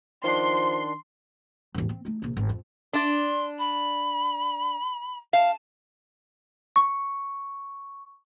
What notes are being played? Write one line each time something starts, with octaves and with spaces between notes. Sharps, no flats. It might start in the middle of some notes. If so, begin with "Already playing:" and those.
D#3 F3 D4 C6
E1 A1
C4
A3 D#4
A#1 C3
G#1
F2
D4 D5 C6
B5
F5 A5
C#6